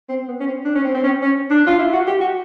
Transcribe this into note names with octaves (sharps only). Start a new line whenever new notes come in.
C4
B3
C#4
C4
D4
C#4
C4
C4
C#4
C#4
D4
F4
E4
F#4
G4
F#4